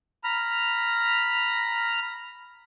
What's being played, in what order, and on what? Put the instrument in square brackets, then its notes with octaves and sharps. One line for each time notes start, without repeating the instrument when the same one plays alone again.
[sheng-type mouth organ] A#5 B5 F6